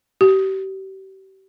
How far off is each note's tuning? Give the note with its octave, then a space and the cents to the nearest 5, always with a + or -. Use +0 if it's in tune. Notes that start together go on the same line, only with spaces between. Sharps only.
G4 -35